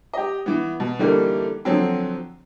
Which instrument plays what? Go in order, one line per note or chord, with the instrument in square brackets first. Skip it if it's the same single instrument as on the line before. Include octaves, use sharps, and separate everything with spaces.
[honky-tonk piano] G4 D#5
E3 B3
B2
D3 E3 G3 A3 A#3 D#4
D3 F3 F#3 C4